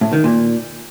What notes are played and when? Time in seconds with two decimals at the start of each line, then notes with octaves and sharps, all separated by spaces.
0.01 A2
0.13 D#3
0.24 A#2